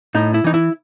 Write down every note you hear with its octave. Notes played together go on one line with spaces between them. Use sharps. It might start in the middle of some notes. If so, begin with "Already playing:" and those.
A2 D#4
E4
E3 D#4
E4